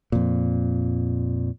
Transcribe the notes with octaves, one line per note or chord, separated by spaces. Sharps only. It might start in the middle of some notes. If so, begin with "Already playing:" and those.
F2 A#2